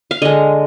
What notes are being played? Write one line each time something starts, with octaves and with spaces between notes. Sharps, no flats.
F5
D3 G#3 D#5